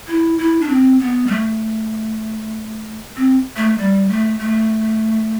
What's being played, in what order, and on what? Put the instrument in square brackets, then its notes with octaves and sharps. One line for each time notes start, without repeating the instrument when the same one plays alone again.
[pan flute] E4
E4
D4
C4
B3
G3
A3
C4
A3
G3
A3
A3